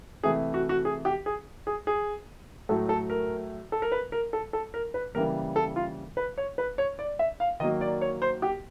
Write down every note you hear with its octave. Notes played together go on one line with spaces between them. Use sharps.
C3 E3 A3 G#4
F#4
F#4
G#4
G4
G#4
G#4
G#4
A2 F#3 A3 A4
A4
A#4
A4
A#4
B4
A#4
A4
A4
A#4
B4
C#3 E3 G3 A#3 A#4
A4
F4
B4
C#5
B4
C#5
D5
E5
F5
D#3 F#3 A#3 D#5
D5
C#5
C5
G4